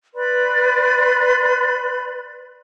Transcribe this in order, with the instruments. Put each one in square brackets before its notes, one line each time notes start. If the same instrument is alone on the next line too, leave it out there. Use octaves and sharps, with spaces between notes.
[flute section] B4 D5 B5 C6